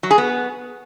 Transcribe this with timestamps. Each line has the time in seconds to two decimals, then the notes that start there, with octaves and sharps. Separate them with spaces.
0.03 F#3
0.11 G#4
0.18 B3